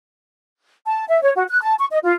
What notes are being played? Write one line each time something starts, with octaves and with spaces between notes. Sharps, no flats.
A5
E5
C#5
F#4
F#6
A5
C#6
D#5
F4